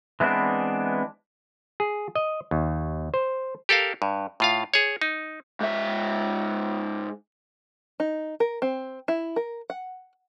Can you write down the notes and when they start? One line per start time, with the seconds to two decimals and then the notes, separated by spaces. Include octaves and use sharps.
0.20 E3 G#3 B3 C4 D4
1.80 G#4
2.15 D#5
2.51 D#2
3.14 C5
3.69 G4 A4 A#4 F5
4.02 G2
4.40 A2 F4 F5
4.74 G#4 C#5
5.02 D#4
5.61 G#2 E5
8.00 D#4
8.40 A#4
8.62 C4
9.08 E4
9.36 A#4
9.70 F#5